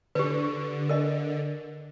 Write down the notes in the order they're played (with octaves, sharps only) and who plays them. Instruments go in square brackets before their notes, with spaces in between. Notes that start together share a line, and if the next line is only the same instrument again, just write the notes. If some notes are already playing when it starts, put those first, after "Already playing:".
[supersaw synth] D3 [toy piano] G4 B4
[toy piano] A#4 D#5